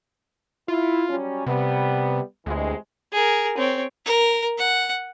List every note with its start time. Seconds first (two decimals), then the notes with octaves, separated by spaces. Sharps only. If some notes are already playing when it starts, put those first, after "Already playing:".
0.68 E4 F4
1.09 F#3 G3 C#4
1.46 C3 G3 B3
2.46 D2 C3 E3 G#3
3.13 G#4 A#4
3.58 C4 C#5
4.05 A#4
4.58 F#5